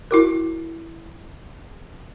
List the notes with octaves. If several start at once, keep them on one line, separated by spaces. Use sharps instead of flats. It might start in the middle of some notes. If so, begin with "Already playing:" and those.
E4 F#4 A#4